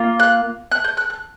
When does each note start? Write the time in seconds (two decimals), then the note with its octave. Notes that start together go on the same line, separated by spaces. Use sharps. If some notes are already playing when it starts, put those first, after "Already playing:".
Already playing: A#3 F4
0.20 F#6
0.72 F#6
0.84 G6
0.97 F#6
1.10 F#6